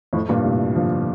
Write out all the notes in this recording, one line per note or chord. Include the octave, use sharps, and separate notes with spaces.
F2 A2
G2 A#2
A2 C3
D3 F3